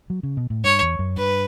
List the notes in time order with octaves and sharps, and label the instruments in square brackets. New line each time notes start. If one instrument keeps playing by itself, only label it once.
[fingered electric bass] F#3
C#3
B2
A2
[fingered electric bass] G2 [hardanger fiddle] C#5
[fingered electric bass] E2
F#2
[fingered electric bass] G2 [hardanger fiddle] B4